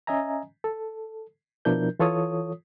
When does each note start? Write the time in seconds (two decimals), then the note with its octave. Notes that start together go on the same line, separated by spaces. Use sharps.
0.07 C#4 D#5 E5 G#5 A#5
0.64 A4
1.65 B2 F3 D4 E4 A#4 G6
1.99 E3 F4 A4 C#5 D#6